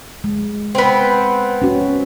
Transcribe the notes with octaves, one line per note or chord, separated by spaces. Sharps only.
G#3
B3 C4
C#4 F#4